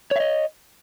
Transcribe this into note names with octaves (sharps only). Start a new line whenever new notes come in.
C#5 D#5 E5